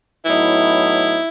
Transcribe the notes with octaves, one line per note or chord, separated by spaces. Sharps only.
A2 F#3 B3 D#4 E4